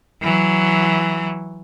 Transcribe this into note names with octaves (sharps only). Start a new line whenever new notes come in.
E3 F#3